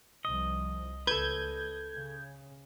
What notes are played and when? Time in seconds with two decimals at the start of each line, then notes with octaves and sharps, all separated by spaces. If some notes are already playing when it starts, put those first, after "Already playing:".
0.25 C2 F3 D#5
1.07 C#2 A4 B4 G6 G#6
1.95 C#3